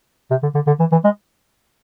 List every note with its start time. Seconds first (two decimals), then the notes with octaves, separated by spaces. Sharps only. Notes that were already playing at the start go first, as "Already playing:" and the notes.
0.30 C3
0.43 D3
0.55 D3
0.67 D3
0.80 E3
0.92 E3
1.04 G#3